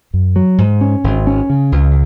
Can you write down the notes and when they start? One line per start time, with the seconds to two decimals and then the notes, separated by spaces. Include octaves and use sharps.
0.14 F#2
0.36 F#3
0.58 G#2
0.81 C#4
1.04 G#1
1.27 C#4
1.50 C#3
1.72 C#2